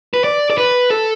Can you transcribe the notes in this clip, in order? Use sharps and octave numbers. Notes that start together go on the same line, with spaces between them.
B4
D5
D5
B4
A4